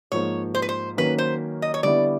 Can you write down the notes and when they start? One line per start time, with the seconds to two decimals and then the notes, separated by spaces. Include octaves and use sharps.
0.12 G#2 F3 A#3 C#5
0.55 C5
0.62 B4
0.69 C5
0.97 D#3 F#3 A#3 C#4 B4
1.18 C5
1.62 D#5
1.74 C#5
1.83 D3 G3 B3 E4 D5